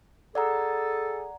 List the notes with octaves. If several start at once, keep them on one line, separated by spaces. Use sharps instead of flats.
G#4 A4 D5 F#5 A#5